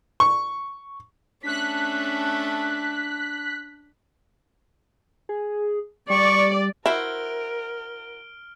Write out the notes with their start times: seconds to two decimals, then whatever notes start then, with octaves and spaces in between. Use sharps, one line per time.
0.20 C#6
1.43 A3 C#4 D4 F#6 B6
5.29 G#4
6.10 G3 D5 C#6
6.86 E4 F#4 A#4 C5 E5 F6 D7 G7